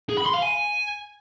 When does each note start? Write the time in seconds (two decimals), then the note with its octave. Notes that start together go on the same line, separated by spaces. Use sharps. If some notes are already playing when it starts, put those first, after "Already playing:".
0.10 G#4
0.18 B5
0.26 C6
0.34 F5
0.43 G#5